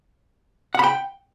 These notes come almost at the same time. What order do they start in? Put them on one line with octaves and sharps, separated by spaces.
F#5 B5 G5